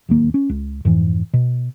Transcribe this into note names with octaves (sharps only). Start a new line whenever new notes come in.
D1 D#2 A#3
C#4
C#2
F2 G#2 E3
B2